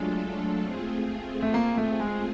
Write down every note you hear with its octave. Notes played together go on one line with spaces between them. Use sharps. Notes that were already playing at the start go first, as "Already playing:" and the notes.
Already playing: F#3 G#3 A3 D4 F4 A4
A3 C4 F4 G#4
A3
A#3
A3
G#3